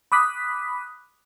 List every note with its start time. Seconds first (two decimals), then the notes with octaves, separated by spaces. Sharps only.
0.12 B5 D6 D#6 F#6 B6